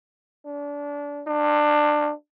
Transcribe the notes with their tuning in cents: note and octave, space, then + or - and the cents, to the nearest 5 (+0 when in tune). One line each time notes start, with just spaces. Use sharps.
D4 -25
D4 +20